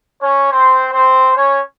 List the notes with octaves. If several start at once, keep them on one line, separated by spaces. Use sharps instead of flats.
C#4 C#5
C4 C5
C4 C5
C#4 C#5